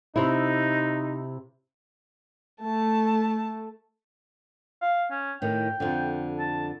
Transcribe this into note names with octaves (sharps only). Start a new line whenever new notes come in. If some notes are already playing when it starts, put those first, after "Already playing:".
C3 D#4 E4
A3 A5
F5
C#4
A2 D#3 G5
F2 D3
A5